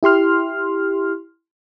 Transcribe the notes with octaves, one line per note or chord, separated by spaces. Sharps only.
E4 G4 C6 F6